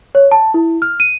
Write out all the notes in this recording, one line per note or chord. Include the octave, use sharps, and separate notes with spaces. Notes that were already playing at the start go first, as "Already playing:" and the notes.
C#5
A5
E4
F6
D#7